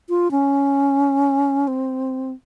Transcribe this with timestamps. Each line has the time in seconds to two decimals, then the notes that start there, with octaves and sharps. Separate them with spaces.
0.09 F4
0.31 C#4
1.68 C4